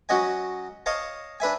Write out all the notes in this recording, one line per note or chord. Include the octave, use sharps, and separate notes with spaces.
F#3 C#4 F#4 D#5 G#5
C#5 D#5 F5 A5
D4 B4 E5 G#5